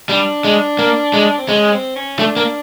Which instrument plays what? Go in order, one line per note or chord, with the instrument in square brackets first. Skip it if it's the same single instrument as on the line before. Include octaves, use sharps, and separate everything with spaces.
[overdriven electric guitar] G3 [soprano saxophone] D4
[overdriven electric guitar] G#3
A#3
G#3
[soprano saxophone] C4
[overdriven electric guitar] G#3 [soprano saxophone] C#4
[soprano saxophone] C4
C#4
[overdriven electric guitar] A3 [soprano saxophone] D4
[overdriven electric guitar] A#3